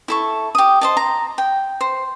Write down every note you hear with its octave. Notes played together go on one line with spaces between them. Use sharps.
E4 A4 C#6
G4 D#6
C5 D#5 A5
A#5
G5
C5